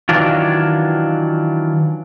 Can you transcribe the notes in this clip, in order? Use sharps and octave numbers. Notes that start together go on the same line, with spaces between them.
D#3 E3 F#3 D4 F4